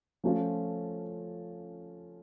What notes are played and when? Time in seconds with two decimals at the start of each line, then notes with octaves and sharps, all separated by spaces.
0.24 F3 A3 C#4 F4